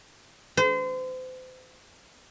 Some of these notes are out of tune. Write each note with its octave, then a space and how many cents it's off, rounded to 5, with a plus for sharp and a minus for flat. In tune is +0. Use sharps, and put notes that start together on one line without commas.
C5 -35